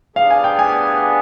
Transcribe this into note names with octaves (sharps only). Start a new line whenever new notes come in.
G3 B3 D4 G#4 F5
G#5
G5
G#5